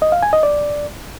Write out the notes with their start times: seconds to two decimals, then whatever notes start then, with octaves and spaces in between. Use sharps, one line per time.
0.02 D#5
0.12 F5
0.23 G#5
0.33 D#5
0.43 D5